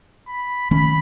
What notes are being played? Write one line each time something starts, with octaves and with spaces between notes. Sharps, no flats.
B5
D#3 A3 C#4 B5